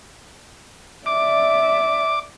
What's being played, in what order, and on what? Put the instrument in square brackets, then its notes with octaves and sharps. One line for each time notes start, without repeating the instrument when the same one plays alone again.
[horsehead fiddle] D5 E5 [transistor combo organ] D6